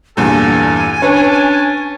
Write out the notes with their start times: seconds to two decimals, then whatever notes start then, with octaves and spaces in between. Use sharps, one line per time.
0.17 E2 G2 A#2 A4 G#5
1.02 C#4 D4 B4 C#5